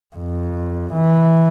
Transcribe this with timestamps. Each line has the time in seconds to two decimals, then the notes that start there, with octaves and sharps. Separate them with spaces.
0.16 F2
0.93 E3